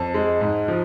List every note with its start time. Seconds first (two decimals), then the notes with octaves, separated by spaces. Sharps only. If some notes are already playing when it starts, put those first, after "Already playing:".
Already playing: F2 A5
0.14 G#3
0.41 G#2
0.68 F3